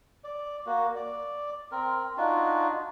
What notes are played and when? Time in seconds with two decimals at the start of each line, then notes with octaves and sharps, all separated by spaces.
0.24 D5
0.66 A#3 F#4
0.96 D5
1.72 C4 A#4
2.17 D4 D#4 F4 F#4